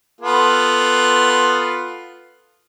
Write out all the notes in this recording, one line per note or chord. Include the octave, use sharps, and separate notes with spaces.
B3 F4 A4